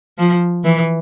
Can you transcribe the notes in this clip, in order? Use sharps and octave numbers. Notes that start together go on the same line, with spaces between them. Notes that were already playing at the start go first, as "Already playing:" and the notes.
F3
E3